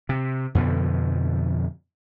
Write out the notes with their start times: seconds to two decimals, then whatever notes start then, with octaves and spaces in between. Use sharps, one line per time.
0.09 C3
0.55 F2 B2 D3 F3